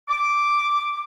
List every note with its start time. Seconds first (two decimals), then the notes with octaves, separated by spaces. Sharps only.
0.09 D6